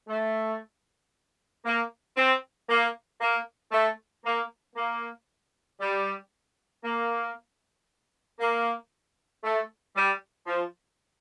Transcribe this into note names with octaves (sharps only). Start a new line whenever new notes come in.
A3
A#3
C4
A#3
A#3
A3
A#3
A#3
G3
A#3
A#3
A3
G3
F3